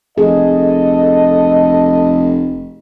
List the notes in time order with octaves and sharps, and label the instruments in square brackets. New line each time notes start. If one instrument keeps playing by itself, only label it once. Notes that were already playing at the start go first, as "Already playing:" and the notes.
[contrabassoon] F1 [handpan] G#4 [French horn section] A4 D#5